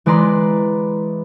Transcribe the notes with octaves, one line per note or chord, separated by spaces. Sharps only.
E3 G#3 B4 D5 A#5 C6